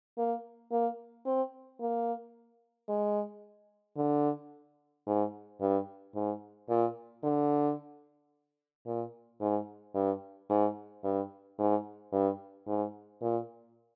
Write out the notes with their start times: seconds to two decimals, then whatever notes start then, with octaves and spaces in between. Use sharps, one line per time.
0.18 A#3
0.72 A#3
1.26 C4
1.80 A#3
2.89 G#3
3.97 D3
5.07 G#2
5.61 G2
6.15 G#2
6.69 A#2
7.24 D3
8.86 A#2
9.41 G#2
9.95 G2
10.50 G#2
11.04 G2
11.59 G#2
12.12 G2
12.67 G#2
13.22 A#2